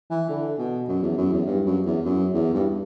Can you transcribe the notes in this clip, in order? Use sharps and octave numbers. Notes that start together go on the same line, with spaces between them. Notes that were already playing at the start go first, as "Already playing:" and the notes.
E3
D3
B2
F#2
E2
F#2
E2
G2
F#2
E2
F#2
E2
G2